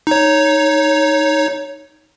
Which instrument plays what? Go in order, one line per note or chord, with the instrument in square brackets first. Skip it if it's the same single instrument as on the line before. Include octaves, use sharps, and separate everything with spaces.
[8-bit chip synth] D#4 C#5